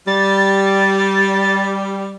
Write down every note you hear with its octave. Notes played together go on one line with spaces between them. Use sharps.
G3 A6